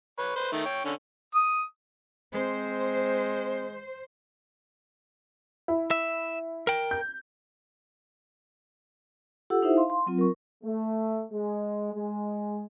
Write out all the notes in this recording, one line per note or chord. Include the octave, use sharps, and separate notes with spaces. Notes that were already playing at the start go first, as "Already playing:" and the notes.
B4 C#5
B4 C5
D#3 A3
C#5 G5
D3 C#4
D#6
G#3 C4 C5
E4
E5
A#4 G5
G6
F4 G4 A4 F#5 E6
D#4 E4 C5 E5
F5 C6
C6
F#3 C4 F4
A#4 C#6
A3
G#3
G#3